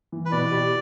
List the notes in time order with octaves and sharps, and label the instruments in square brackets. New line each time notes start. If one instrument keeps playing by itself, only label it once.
[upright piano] E3
[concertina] B4
[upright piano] B2 [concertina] D5
[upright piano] G4